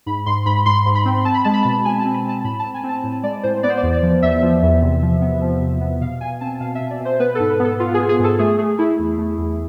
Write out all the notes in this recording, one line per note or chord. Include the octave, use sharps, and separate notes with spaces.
G#2 B5
G#2 C6
G#2 B5
G#2 C6
G#2
B5
C4
C4 A5
B5
G#3 A5
B5
B2 A5
G#3 G#5
A5
C4
B5
C4 A5
A2 B5
C4 A5
G#5
C4
A5
A2
G#3 D5
A2 C5
B3 D5
C5
D5
E2
D5
F3
E2 E5
F3
E2
C3
F3
B3
F3
C3
B3
B2 F5
B2 G#5
C4 A5
B2 F5
E5
B2
D5
B2 C5
B3 B4
G#2 A4
B4
B3
A4
B3 F4
G#4
B3
G#4
G#2 A4
A3 G#4
A3 G#4
A3 E4
E2
A3
E2